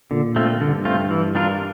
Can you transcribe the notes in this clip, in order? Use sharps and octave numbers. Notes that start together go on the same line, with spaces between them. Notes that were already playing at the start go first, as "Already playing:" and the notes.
A#2 D3
A3 C4 F4
G2 D3
A3 C4 F4
E3
G3 D4 F4 A#4